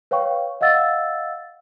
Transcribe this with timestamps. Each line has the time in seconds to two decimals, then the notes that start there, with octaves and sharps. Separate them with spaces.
0.11 B4 C#5 F5 G5 C#6
0.61 D#5 F5 F#5 E6 A6